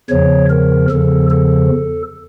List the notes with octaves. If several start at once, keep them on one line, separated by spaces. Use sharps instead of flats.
E2 C#3 F3 C#5
A#4
E2 C#3 F3 A4
A4